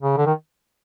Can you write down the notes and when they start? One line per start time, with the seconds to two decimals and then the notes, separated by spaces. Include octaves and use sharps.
0.02 C#3
0.17 D3
0.26 D#3